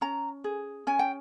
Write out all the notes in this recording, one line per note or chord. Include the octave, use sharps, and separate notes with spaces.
C#4 A#5
G#4
C#4 G#5
G5